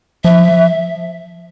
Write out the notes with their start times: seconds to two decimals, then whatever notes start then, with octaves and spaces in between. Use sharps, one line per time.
0.24 F3 E5